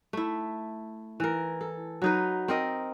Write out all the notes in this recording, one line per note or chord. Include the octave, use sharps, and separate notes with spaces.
A3 E4
E3 A#4
A4
F#3 D#4 B4
C4 A#4 D#5